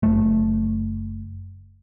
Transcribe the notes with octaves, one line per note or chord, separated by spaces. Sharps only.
F#1 A3